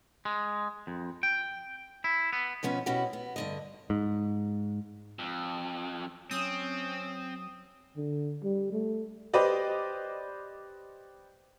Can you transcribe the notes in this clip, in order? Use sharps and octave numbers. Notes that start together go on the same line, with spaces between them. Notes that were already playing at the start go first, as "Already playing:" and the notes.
G#3
F2
G5
E4
B3
B2 F3 B3 C#4
B2 C#4 E4 F#4 G4
B3
G2 D3 D#5
G#2
F2
F#3 C4 C#4 D#6
D3
G3
A3
G4 B4 C5 D5 D#5